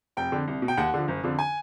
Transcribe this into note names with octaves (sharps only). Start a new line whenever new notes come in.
F1 G5
F2 D3
C2
B2
G5
D#2 F#5
D3 F3
F#1
F2 D3 F3
G#5